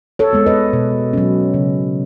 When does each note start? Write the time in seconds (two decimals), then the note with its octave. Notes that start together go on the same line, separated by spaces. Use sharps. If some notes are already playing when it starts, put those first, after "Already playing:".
0.19 A4 C#5
0.33 G#3 B3
0.46 B4 D#5
0.73 B2
1.13 F#3 C#4
1.54 C#3